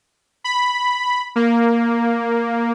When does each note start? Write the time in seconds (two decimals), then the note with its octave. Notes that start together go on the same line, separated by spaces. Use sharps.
0.44 B5
1.36 A#3